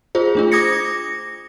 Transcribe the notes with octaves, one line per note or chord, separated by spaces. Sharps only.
F4 G#4 C5
A3 D4 F4
D6 D#6 G#6 A#6 C#7
A#6